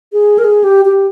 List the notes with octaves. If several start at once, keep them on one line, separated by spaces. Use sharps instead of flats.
G#4
A#4
G#4
G4
G4